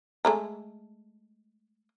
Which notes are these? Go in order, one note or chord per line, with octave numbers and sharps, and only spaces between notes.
G#3 A3 A#5